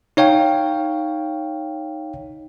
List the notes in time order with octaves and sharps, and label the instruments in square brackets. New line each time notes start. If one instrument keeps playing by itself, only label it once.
[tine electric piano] D#4 C#5 F5 G5